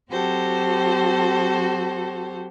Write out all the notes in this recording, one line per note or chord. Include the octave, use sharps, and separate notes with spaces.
F#3 C4 F#4 G4 A4 C5